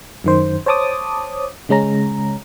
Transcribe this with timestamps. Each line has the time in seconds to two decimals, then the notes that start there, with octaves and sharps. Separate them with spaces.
0.24 F#2 D#3 C5
0.66 C5 C#5 A5 D6 D#6
1.69 C#3 G#3 C#4 A#5